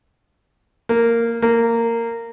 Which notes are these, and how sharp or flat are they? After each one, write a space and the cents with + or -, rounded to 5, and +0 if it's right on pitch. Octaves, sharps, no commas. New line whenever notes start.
A#3 -10
A#3 -15